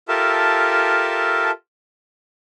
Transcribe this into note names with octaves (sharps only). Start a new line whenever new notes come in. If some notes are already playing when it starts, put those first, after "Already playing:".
F4 G4 A4 A#4 E5 A5